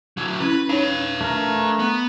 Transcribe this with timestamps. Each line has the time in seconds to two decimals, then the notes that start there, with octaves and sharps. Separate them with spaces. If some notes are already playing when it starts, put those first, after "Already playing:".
0.17 D3 F#3
0.40 C#4 E4 B4
0.69 D#4 B4 C#5 F5
1.21 A3 A#4
1.79 B3